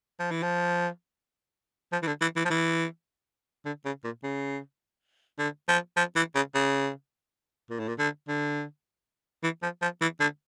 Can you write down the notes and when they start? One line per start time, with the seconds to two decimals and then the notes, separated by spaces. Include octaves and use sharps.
0.20 F3
0.31 E3
0.43 F3
1.93 F3
2.03 E3
2.07 D3
2.22 E3
2.36 E3
2.46 F3
2.51 E3
3.66 D3
3.85 C#3
4.04 A#2
4.24 C#3
5.39 D3
5.68 F3
5.97 F3
6.16 E3
6.35 C#3
6.55 C#3
7.70 A#2
7.80 A2
7.88 A#2
7.99 D3
8.29 D3
9.43 E3
9.63 F3
9.82 F3
10.01 E3
10.21 D3